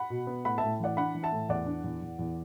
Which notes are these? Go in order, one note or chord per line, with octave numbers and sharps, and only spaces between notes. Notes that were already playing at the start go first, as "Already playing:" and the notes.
Already playing: F#5 B5
B2
B3
A2 F#5 B5
A2 E5 A5
E3 D5 F#5
D4 F#5 B5
E3
E5 A5
A2
E2 D5 F#5
D4
E2
E2
E2